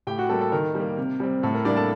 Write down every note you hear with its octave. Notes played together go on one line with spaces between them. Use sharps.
A2 G4 G5
F#4 F#5
G3 A#3 A4
A4
D#3 A#4
G3 A#3
C3
G3 C4
A2 A4
A#4
G3 A#3 D4 D5
A4 A5